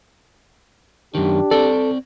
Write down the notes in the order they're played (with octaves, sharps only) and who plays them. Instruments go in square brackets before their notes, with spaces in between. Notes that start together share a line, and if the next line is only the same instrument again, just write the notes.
[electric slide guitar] F#2 D#3 [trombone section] D4 G4
[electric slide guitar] C4 D5 [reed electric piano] A4